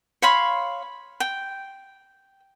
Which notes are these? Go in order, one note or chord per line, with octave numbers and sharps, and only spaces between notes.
C#5 F5 B5 C6
G5